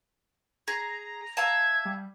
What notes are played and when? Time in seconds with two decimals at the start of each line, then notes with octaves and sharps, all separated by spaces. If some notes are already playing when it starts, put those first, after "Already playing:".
0.68 G#4 A#5
1.37 E5 F5 A5 G#6
1.85 G3